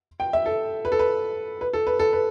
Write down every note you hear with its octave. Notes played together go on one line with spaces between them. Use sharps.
G5
E5
A4
B4
A4
B4
B4
A4
B4
A4
B4